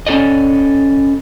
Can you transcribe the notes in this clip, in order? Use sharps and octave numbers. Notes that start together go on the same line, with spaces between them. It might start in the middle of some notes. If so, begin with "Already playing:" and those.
C#4 F4 A4 D5 D#5